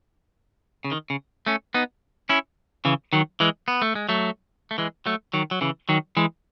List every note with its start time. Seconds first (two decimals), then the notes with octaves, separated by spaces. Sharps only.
0.85 C#3
0.92 D#3
1.10 C#3
1.46 A3 C#4
1.74 B3 D#4
2.29 C#4 E4
2.85 C#3 E3
3.13 D#3 F#3
3.40 E3 G#3
3.68 B3
3.82 A3
3.95 G#3
4.09 F#3 A3
4.71 A3
4.78 E3 G#3
5.06 F#3 A3
5.33 D#3 F#3
5.51 F#3
5.61 C#3 E3
5.89 D#3 F#3
6.17 E3 G#3